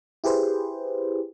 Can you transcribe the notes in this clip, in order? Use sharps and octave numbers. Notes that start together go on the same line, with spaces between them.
E4 G4 G#4 B4 C5